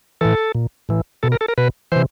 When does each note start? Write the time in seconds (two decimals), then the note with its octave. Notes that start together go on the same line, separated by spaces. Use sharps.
0.21 A2 E3 A4
0.55 A#2
0.89 A2 E3
1.23 B2 A4
1.32 A#4
1.41 A4
1.48 A#4
1.58 B2 B4
1.92 C3 E3 C5